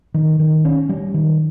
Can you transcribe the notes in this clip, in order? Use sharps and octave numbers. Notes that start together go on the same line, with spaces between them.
D#3
D#3
C#4
G3
D#3